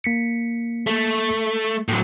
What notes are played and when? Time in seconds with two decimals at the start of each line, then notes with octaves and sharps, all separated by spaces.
0.04 A#3 B6 C#7
0.87 A3
1.88 A2 F#3